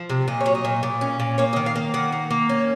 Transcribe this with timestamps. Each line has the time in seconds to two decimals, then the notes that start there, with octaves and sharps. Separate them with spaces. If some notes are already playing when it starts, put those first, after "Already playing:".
Already playing: F3
0.10 C3
0.28 A#2 D#5
0.41 C#5
0.46 F#3
0.55 D#5
0.65 A#2
0.83 A#2
1.01 C#4
1.20 A#2
1.38 A#3 C#5
1.53 D#5
1.56 D#3
1.66 F5
1.76 A#3
1.94 D#3 F#5
2.12 A#3
2.31 A#3
2.49 C#4